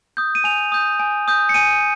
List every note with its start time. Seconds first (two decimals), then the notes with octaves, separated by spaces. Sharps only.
0.17 D#6 G6
0.35 D#7
0.44 G#5 F7
0.72 D#6 G6
0.99 G#5
1.28 D#6 G6
1.49 C#7
1.54 G#5 D#7